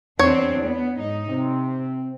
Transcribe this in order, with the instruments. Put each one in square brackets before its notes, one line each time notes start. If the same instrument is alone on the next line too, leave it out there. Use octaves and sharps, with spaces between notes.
[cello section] E2 C4 D4 [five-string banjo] C#5
[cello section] B3
G#2 D#4
[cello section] C3 [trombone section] C4